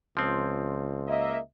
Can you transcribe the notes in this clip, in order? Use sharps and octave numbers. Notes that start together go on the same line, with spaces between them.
C#2 F3 C4
A#3 D#5 E5